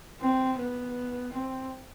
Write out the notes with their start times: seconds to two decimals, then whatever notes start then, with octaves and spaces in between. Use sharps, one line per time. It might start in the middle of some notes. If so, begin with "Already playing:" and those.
0.20 C4
0.58 B3
1.31 C4